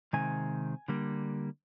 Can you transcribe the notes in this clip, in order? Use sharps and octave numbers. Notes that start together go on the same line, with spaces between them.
C3 D#3 G#3 C4 G#5
D3 G3 A#3